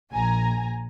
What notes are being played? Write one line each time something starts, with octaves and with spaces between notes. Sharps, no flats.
A#1 G#5 A#5